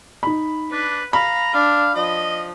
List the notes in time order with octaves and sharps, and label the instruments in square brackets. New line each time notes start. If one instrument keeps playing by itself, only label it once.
[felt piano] D#4 B5
[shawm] D4 [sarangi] B4
[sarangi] F5 [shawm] A#5 [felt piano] B5
[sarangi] D4 [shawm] F5
[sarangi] F3 [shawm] D#5